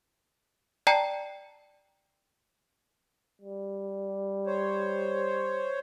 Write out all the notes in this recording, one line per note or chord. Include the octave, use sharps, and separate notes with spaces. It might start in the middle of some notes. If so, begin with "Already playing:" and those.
D5 G5 A5 A#5 C7
G3
C5 C#5